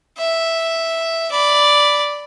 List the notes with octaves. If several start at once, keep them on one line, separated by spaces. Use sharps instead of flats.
E5
D5 B5